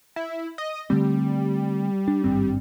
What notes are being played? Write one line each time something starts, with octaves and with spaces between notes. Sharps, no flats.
E4
D#5
D3 G3 A3 C4
D4
G#1 G2 C4